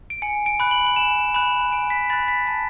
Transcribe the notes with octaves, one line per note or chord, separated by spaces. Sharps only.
D7
G#5 C#7
D7
B5 F#6
F#7
F#7
G#5 E7
B5 F#6
G#5 D7
B6
B5 F#6 A6
B6
A5